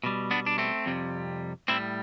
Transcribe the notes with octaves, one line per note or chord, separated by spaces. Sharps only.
B2 G3
B3 D4
D4
A3 C4
F2 C3 G3
A2 G3 C4 E4